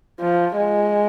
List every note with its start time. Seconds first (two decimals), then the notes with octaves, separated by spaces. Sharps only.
0.20 F3
0.56 G#3